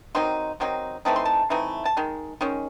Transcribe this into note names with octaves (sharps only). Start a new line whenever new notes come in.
D#3 F#3 C4 D#4 C6
D#3 F#3 C4 D#4
E3 A3 C4 D#4 A5
C6
A5
E3 A3 C4 D#4
A5
D#3 G#3
D#3 G#3 C#4